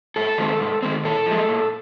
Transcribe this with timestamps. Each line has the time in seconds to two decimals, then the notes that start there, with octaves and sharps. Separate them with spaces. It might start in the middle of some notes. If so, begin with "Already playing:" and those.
0.16 G#2 A4
0.38 D#3 G#3 C4
0.60 G#2
0.82 D#3 G#3 C4
1.04 A#2 A4
1.26 F3
1.31 G#3
1.49 A#2